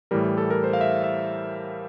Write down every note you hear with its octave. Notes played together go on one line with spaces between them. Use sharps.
A2 E3 G3 A#4
A4
A#4
C5
F5
E5
E5